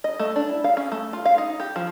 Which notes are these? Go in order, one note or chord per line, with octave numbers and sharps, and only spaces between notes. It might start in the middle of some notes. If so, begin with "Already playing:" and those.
D#5
A3
D4
E4
F5
C#4
A3
F4
F5
D#4
G4
F3